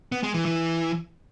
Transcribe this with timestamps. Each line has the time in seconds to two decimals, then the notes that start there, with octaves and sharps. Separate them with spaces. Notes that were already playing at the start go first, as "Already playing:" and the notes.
0.12 B3
0.23 G#3
0.34 E3
0.45 E3